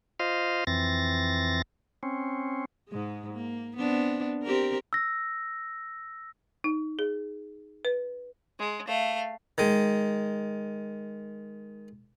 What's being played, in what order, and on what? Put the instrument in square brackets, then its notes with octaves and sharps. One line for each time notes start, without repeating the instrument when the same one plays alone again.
[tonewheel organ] F4 C5 D#5 F5
F2 E3 C4 A6 A#6
C4 C#4
[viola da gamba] G#2 G#3
A#3
B3 C4 D4
C4 G4 A#4
[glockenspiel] E6 A#6
[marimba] D#4
G#4
B4
[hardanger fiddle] G#3
A3 F5
[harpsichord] D#3 G#3